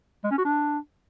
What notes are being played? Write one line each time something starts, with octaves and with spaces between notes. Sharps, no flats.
G#3
C#4
F#4
D4